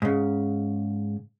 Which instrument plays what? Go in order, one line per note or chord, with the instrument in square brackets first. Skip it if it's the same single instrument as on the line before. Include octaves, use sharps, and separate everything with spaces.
[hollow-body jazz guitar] G#2 C#3